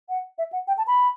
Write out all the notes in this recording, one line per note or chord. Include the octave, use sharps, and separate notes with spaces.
F#5
E5
F#5
G5
A5
B5